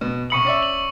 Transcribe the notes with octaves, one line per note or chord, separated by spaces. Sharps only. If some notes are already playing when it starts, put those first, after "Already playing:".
B2
C2 B5 C#6 D#6 C#7 F#7
C#4 D5 E5
F#7